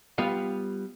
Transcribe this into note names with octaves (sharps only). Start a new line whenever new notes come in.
G3 B3 F4 F5